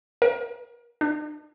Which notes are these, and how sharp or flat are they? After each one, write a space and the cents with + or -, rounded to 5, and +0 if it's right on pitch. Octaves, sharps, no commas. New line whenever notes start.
A#4 +40
D4 +45